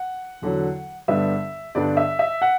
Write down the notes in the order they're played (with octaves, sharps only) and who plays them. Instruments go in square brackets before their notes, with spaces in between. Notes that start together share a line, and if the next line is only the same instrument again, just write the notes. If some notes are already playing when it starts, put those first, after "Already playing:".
Already playing: [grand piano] F#5
E2 D3 F#3
G2 D3 G3 B3 D4 E5
G2 D3 G3 B3 D4 D5
E5
E5
F#5